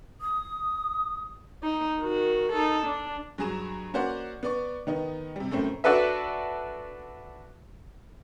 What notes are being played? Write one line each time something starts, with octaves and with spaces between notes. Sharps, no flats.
D#6
D#4
D#3 F#4
D#4 A4
D4
G2 F#3 G#4 A#5 E7
A#3 C#4 F#4 C5 D5 F#5
B3 D5 C#6
D#3 B3 D#4
C3 G3
F#2 A2 A3 C4
D4 F#4 A4 B4 E5